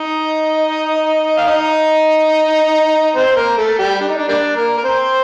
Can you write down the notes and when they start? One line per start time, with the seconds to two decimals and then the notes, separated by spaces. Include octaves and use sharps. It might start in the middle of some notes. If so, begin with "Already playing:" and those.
Already playing: D#4 D#5
1.38 F5
1.47 D#4 D#5
3.15 C4 C5
3.36 A#3 A#4
3.57 A3 A4
3.79 G3 G4
4.00 D4
4.09 D#4
4.18 D4
4.28 G3 A#3 D4
4.56 A#3 A#4
4.78 A#4
4.84 C4 C5